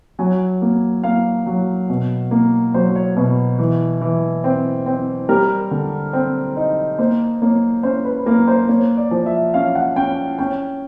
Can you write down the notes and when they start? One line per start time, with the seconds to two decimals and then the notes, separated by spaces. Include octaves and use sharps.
0.19 F#3 G#5
0.62 A#3
1.04 A#3 F5
1.46 F#3
1.89 B2
2.31 A#3
2.74 F#3 C5
2.96 C#5
3.17 B2 B4
3.58 E3
4.01 E3
4.44 C4
4.86 C4
5.29 G3 A#4
5.71 D3
6.13 C4
6.57 D#4
6.98 A#3 C5
7.41 A#3 C#5
7.83 C#4 C5
8.05 B4
8.26 A#3 A#4
8.48 C5
8.68 A#3 C#5
8.97 D5
9.11 F3
9.26 E5
9.54 C#4 F5
9.75 F#5
9.96 C#4 G5
10.38 C#4 G5